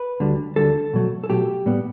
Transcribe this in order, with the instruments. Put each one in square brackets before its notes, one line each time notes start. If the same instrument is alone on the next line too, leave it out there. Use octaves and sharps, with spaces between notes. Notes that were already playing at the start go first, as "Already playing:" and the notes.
Already playing: [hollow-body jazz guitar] B4
D2 D3 G3
D2 D3 G3 A4
B2 F#3 A3
A4
B2 F#3 A3 G4
A2 G3 B3